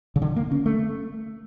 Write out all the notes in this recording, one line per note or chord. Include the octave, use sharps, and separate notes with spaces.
C#3
D3
A#3
C#4
A3